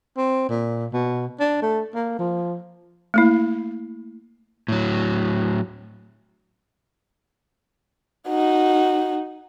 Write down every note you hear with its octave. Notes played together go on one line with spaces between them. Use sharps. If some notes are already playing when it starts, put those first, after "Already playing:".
C4
A#2
B2
D4
A3
A#3
F3
A3 A#3 E4
A2 F#3
D#4 F#4